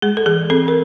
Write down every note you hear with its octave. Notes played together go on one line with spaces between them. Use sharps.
G#3 G#4
A4
E3 G#4
C4 A4
A#4